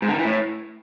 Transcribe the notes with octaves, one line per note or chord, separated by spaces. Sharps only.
G#2
D3
D#3
E3
A2